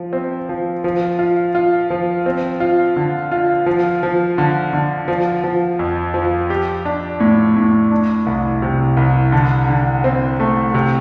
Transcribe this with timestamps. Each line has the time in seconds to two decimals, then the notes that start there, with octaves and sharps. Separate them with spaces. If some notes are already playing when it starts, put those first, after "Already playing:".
Already playing: F3
0.13 C4
0.49 F3
0.84 F3
1.19 F4
1.55 F4
1.90 F3
2.26 C4
2.60 F4
2.96 D3
3.32 F4
3.66 F3
4.03 F3
4.38 D3
4.73 D3
5.08 F3
5.44 F3
5.79 F2
6.14 F3
6.50 G4
6.85 D4
7.20 A2
7.56 A2
7.91 D4
8.26 C2
8.62 C3
8.97 C2
9.32 D3
9.69 D3
10.04 C4
10.40 A3
10.74 C3